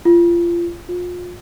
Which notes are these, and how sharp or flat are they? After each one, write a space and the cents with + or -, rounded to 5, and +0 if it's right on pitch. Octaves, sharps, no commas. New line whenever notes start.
F4 -25
F4 +30